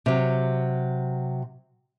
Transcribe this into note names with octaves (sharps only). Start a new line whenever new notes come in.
C3 F#3